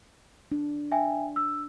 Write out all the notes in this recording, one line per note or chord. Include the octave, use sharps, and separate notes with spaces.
D4
E5 G5 G#5
E6